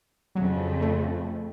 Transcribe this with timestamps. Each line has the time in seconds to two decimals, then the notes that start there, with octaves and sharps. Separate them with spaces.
0.35 F2 C#3 F#3
0.81 A3